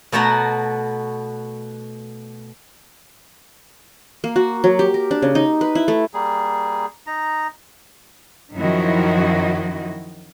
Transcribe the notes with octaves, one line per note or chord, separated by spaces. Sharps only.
B2 A3 B3 F#4 A#5
A#3
F#4
F#3
G4
A#4
D4
C#3
D#4
B4
E4
A3
G3 A#3 G#4
D#4 A#5
F#2 D#3 F3 E4 F#4 D#5